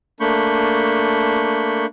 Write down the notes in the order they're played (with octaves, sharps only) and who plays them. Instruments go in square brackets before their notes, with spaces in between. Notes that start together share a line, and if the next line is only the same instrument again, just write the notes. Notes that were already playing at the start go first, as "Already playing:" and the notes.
[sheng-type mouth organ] A3 A#3 D4 B5 C#6 G6